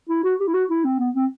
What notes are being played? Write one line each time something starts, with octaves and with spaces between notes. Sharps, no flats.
E4
F#4
G4
E4
F#4
E4
C4
B3
C4